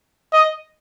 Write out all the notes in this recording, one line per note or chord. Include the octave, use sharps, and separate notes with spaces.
D#5